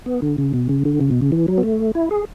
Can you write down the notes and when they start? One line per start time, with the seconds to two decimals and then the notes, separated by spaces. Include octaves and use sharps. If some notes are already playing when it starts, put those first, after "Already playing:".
0.06 B3
0.22 D3
0.38 C#3
0.54 B2
0.69 C#3
0.85 D3
1.00 C#3
1.11 B2
1.21 C#3
1.32 E3
1.48 F#3
1.58 B3
1.63 A3
1.95 E4
2.11 G#4